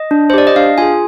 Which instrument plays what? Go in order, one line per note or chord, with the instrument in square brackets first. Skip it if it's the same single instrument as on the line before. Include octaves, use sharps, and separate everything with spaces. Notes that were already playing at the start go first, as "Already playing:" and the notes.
Already playing: [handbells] D#5
D4
C5
G4 D5
D#5
D4 F5
F4 G#4 G#5